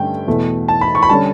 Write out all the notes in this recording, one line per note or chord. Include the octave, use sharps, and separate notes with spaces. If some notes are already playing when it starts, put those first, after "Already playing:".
Already playing: G2 D3 A3 C#4 G5
E2 B2 A3
A5
B5
C#6
B5
D3 G3 C#4 A5